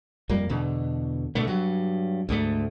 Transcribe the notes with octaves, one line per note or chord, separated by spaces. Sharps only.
F2 G3 A#3
E2 B2 D3
B2 D3 A3
G2 F#3
D2 G#2 A3